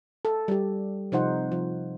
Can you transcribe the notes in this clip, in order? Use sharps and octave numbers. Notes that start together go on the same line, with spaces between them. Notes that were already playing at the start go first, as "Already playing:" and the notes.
A4
G3 G4
C3 F3 D#4 C5 F#5
F3